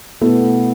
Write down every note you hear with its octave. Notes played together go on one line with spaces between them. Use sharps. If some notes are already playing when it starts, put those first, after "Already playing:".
B2 A3 B3 E4 A4